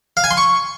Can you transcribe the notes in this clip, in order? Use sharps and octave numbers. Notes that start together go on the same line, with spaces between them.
F5
G#5
C6
C#6